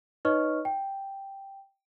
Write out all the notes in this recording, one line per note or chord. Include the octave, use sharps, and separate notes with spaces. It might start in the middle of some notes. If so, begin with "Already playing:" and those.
D#4 B4 C#5 D#5 C#6 F6
G5